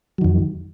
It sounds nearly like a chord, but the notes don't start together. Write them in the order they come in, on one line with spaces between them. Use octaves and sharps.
F#3 D#3 F2